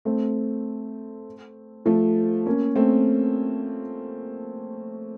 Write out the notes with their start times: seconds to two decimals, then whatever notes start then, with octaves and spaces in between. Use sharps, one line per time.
0.05 A3 C4
1.86 F3 A3
2.46 A#3 C#4
2.76 A3 C4